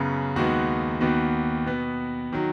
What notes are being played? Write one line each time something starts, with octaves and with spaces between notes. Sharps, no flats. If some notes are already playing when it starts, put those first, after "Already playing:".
Already playing: F#2 C#3 B3
D#2 D#3 G#3 B3 F#4
D#2 D#3 B3 F#4
B2 B3
D#3 F#3